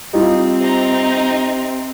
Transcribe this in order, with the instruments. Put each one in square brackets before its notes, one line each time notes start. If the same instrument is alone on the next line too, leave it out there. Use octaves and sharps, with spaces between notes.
[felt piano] G3 F4 [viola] C4 [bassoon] D#4
[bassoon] C3 [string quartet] D#4 A#5